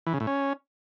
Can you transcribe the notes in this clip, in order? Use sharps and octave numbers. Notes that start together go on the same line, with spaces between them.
E3
C#3
A2
C#4